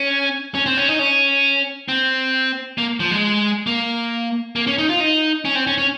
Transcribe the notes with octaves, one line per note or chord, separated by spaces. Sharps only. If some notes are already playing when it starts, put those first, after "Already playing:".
Already playing: C#4
C#4
C4
C#4
D#4
C#4
C4
A#3
F3
G#3
A#3
A#3
C#4
D#4
F4
D#4
C#4
C4
C#4
C#4